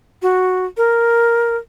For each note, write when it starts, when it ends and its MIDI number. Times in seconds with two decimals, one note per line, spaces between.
0.22 0.66 66
0.77 1.57 70